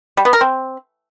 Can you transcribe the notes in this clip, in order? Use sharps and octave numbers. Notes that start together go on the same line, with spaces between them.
G3
B3
A#4
C4